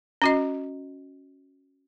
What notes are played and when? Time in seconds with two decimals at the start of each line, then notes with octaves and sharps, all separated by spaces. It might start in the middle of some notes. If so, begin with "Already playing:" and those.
0.22 C#4 F#4 D#5